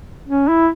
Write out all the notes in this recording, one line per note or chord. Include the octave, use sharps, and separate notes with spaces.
C#4
E4